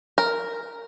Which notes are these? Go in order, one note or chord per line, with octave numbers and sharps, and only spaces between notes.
A#4